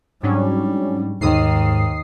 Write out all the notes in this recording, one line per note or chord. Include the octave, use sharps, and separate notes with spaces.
G#2 F#3 G3 C#4 D4
D#2 G#2 D#3 D#6 C7